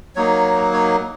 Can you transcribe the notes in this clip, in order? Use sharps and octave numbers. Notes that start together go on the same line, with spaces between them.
F#3 A#3 D#4 C#5
C#5